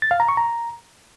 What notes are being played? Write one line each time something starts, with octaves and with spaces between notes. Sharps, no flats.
A6
F5
A#5
C#6
A#5